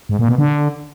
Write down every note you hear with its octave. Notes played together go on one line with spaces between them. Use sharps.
G#2
A#2
B2
D3